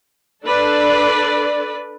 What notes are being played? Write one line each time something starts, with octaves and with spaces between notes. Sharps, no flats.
D4 A4 B4 D5